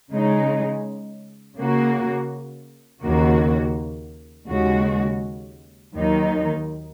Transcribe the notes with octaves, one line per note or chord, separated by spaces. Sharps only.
C#3 G#3 D#4
C#3 A#3 F#4
D#2 C#3 A#3 F#4
D#2 C#3 G#3 F#4
D#2 D#3 F#3 D#4